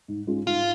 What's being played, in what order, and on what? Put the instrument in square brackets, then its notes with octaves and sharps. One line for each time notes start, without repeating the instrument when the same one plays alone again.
[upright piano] G#2
G#3 C#4 F4
[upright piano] G#2 [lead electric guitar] F4